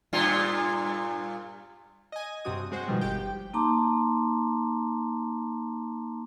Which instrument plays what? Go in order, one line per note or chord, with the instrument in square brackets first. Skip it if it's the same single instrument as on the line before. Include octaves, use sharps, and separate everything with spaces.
[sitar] G2 A#2 F4
[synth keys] D#5 G#5
G2 C3 C4 F#4 D#6
G#3 F#4 C5
B2 D#3 F3 G3 G#3
G1 G4 G5
[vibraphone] A#3 D#4 A5 A#5 C6 D6